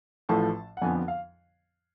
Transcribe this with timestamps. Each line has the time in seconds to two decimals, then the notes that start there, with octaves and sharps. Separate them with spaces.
0.29 A1 A2 F3 A3 A5
0.77 F#5
0.82 F2 D3 F3 B3 G#5
0.95 F#5
1.08 F5